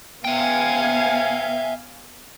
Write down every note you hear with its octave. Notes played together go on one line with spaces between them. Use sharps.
B3 E5 F5 G5 G#5